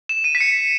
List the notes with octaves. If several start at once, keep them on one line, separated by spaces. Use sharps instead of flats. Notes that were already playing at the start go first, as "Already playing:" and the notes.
E7
D#7
B6
C#7